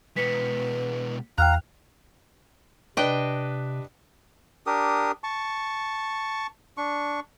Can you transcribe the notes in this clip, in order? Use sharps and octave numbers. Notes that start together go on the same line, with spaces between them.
B2 G#3 B4 B6 C#7
E2 F5 G5 A#5 F6 F#6
C3 D4 B4 D#5 G5
D4 G4 A#4 D#6
A5 C#6
D4 C#6